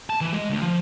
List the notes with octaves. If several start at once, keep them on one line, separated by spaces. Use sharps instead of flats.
A5
E3
G#3
D2
F3